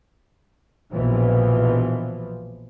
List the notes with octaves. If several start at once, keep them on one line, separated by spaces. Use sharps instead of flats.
A#1 B2 E3 F3